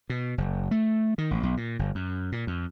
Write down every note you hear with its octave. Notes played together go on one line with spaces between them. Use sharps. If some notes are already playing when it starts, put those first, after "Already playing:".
B2
F#1
A3
D#3
A1
B1
A#2
G1
F#2
A#2
F2